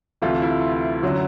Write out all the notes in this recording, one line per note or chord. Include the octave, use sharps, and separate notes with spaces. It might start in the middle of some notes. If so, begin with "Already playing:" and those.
D2 C3 E3 A3 F4
E4
F#2 D3 F#3